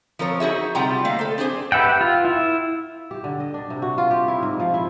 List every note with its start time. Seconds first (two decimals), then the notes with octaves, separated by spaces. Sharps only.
0.19 F3 C4 A#4 C#5
0.40 D#4 F#4 G#4 E5
0.75 C3 G3 F4 F#5 G5 A#5
1.05 A3 A#3 D5 F5
1.19 A4 C5
1.38 C4 D4 G#4 C5
1.72 G4 B4 E5 F#5 G5
2.01 F4
2.25 E4
3.11 G4
3.24 D3
3.40 D#5
3.54 D4
3.70 C3
3.82 F#4
3.98 F4
4.11 G4
4.28 E4
4.43 G#2
4.60 F3
4.74 E4